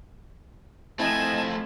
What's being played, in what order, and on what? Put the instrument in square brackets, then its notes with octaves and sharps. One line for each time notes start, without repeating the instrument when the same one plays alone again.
[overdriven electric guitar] F3 A3 [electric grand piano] C4 E4 [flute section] D#5 A5 [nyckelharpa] G#5